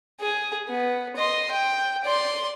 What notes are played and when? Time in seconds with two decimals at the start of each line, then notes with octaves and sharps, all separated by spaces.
0.20 G#4
0.69 B3
1.16 D#5 C6
1.51 G5
2.04 D5 C6